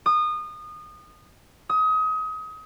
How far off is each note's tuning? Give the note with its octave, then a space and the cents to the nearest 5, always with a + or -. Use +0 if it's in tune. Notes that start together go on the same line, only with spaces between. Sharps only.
D#6 -25
D#6 +30